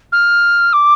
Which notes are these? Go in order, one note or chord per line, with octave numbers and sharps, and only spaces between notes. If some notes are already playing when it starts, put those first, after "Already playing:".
F6
D6